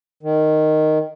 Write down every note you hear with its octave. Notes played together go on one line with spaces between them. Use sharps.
D#3